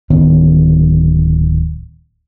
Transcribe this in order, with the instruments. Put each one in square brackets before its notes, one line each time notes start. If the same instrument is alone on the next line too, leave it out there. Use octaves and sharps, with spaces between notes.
[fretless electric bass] D1 D#3 B3 C#4